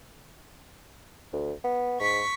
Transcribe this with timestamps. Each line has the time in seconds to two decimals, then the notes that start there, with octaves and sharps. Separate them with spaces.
1.33 D2
1.64 B3
2.00 G#2 C#6 B6